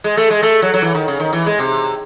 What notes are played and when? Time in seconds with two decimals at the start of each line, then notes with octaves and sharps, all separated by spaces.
0.04 G#3
0.17 A3
0.30 G#3
0.43 A3
0.62 F#3
0.74 F#3
0.82 E3
0.95 D#3
1.08 C#3
1.20 D#3
1.33 E3
1.46 G#3
1.59 C3